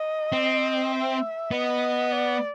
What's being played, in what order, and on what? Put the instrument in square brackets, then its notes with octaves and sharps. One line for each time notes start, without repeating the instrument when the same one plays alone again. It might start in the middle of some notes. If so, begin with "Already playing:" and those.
Already playing: [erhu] D#5
[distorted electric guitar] C4
[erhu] E5
[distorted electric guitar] B3 [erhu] D#5
[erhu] D5